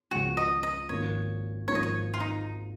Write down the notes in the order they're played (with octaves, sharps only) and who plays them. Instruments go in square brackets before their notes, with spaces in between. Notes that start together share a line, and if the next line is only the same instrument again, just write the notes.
[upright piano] C#2 C#3 F3 G#3 [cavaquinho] F#4
[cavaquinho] D#5
D#5
[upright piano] G#1 G#2 F3 A#3 [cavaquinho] C#5
[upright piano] G#1 G#2 F3 A#3 [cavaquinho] C#5
[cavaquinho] D#5
C#5
F4
D#4